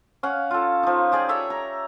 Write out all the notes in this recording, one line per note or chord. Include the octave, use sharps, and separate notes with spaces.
C#4 F5 F#5
F4 A4
F3 D#4
G4 G#4 D5
A4 C#5 E5
A#5